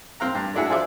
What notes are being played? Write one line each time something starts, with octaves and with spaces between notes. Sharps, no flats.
C4 F5 A#5
G2
A3 A#3 D4 E4 F#4 G#4
F4 G#4 C5 D5 E5 D6